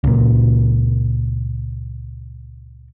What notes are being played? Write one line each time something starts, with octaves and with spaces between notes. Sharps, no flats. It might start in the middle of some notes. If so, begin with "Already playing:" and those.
C#2 A#2